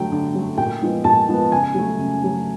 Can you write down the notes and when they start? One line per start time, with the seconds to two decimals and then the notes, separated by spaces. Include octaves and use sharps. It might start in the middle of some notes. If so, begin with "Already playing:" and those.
Already playing: D3 F#3 A3 G5
0.12 D3
0.34 F#3 A3
0.58 A#2 G5
0.82 F3 G#3 B3
1.04 A#2 A5
1.29 F3 G#3 B3
1.52 C#3 G#5
1.75 F#3 A3
1.99 C#3
2.21 F#3 A3